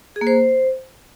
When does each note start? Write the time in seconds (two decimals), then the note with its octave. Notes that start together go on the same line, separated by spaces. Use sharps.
0.16 G#4
0.21 A#3
0.27 C5